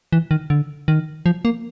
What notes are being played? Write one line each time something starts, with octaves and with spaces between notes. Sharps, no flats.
E3
D#3
D3
D#3
F3
A#3